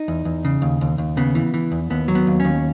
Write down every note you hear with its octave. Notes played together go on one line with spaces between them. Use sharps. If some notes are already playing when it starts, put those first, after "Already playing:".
Already playing: D#4
E2
E2
C#3
D#2
D#2
D#2
C#3 B3
E3
E3
E2
D#2 B3
F#3
B3
D#2
D#2 C#4